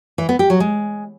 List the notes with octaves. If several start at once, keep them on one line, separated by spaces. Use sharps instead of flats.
E3
B3
G4
F#3
G#3